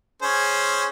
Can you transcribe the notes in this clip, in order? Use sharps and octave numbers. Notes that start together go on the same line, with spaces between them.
C#4 G#4 C5